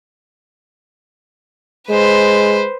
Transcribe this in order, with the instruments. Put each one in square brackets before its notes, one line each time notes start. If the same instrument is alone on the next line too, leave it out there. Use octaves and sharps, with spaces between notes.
[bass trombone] G#3 [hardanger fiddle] B4 C5